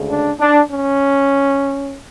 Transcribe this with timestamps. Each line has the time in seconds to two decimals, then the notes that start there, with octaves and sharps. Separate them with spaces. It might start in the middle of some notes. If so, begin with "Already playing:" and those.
Already playing: D2 C#3 G#3
0.09 D4
0.39 D4
0.70 C#4